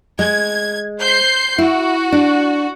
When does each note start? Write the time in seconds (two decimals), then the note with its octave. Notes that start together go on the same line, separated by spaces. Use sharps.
0.19 G#3 G#6
1.00 C5 G6 C7
1.58 E4 F#4
2.12 D4